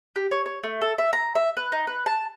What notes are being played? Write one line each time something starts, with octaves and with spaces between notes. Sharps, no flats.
G4
C#5
C#5
A3
A4
E5
A#5
E5
B4
D#4
B4
A5